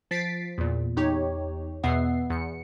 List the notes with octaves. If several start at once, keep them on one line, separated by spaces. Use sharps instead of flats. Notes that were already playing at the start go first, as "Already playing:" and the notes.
F3 A6 B6 C7 D7
E2 A#2
E2 D#4 G4 C#5
E2 B2 B3 E5 F#5 C7
E2 C#7